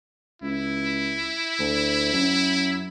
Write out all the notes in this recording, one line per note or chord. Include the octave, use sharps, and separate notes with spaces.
C#2 E4
D2
F#2